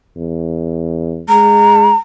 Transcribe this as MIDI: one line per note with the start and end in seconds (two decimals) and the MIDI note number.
0.16 1.22 40
1.29 1.91 56
1.29 1.96 82